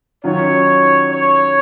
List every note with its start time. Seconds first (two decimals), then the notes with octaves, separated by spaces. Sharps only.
0.24 D#3 F#3 C#4 F4 C#5
1.09 C#5